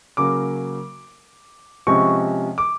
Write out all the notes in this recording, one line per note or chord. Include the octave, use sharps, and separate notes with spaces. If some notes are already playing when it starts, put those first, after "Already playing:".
C#3 F#3 A#3 D6
C3 F3 G#3 C#4 C#6
D6